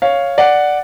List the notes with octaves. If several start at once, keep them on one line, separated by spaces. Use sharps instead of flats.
C#5 F5
D5 F#5